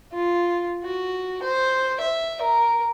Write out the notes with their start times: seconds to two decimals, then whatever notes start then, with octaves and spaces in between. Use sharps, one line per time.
0.13 F4
0.83 F#4
1.42 C5
2.01 E5
2.41 A#4